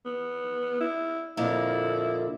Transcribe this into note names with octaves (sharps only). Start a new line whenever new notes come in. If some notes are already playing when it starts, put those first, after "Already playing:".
B3
E4
F2 A#2 D3 E4